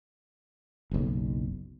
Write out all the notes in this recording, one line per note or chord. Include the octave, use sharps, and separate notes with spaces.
F#1 B1